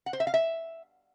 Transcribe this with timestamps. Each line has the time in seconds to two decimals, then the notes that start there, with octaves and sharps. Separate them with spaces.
0.06 F#5
0.13 C5
0.20 E5
0.27 F5
0.34 E5